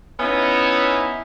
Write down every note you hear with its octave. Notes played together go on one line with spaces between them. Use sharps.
B3 C#4 D#4 E4